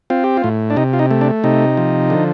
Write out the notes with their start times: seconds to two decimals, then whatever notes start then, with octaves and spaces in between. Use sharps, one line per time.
0.10 C4 F4
0.24 G4
0.37 F4
0.44 A2
0.70 D4
0.76 C3 D#4
0.93 F4
0.99 D#4
1.11 A3
1.21 D4
1.44 C3 D#4
1.77 F3
2.10 D3